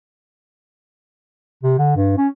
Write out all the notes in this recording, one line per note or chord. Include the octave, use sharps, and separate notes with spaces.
C3
D3
G2
C#4